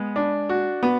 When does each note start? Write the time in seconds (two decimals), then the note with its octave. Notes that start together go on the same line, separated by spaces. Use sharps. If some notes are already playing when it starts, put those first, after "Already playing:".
Already playing: G#3 B3
0.16 D4
0.49 F#4
0.83 B3